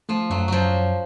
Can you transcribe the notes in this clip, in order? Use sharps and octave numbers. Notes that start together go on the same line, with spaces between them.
F3 A3
F#2 F#3
F#2 F3 F#3
F#2